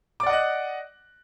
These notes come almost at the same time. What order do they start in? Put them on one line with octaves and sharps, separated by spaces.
D6 D5 F#5 D#5 F#6